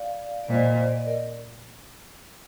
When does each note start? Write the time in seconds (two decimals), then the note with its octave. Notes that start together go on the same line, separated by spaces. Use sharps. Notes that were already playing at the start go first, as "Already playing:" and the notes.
Already playing: D5 F5
0.44 D5
0.50 A#2 C5 D#5
0.89 D5
0.98 D#5
1.06 A#4 D5